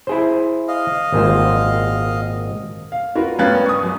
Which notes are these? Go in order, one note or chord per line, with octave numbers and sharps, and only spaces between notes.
E4 G#4 C5
D#5 F5
G#1 A#2 C5
F5
F4 F#4 A#4 B4
G2 B3 C#4 F5 F#6 A6
C#6 D#6
F#2